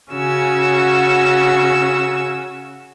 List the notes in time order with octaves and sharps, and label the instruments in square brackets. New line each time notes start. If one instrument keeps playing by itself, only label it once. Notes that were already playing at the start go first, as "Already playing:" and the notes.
[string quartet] C#3 C#4 F#4 E6